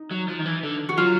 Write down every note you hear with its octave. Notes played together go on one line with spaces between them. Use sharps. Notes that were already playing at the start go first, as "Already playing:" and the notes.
Already playing: D#4
F#3
F3
D#3
E3
D3
F#4
F#3 F4